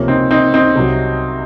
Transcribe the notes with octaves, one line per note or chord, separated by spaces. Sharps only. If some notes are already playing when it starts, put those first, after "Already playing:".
Already playing: C#2 C3 F3 A#3 C#4
C4 D#4
C4 D#4
C4 D#4
C2 C3 F#3